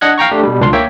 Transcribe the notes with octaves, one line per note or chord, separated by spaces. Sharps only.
D4 D#5 F#5 F#6 G#6
F5 G5 A#5 C#6
A3 D4 G4
B2 G3
C#2 D#3 D4 F4 F5 C6
A#3 C#5 E5 G5